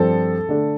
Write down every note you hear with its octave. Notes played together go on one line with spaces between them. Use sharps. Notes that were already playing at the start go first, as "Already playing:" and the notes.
Already playing: G2 F3 C4 A4
D3 A3 D4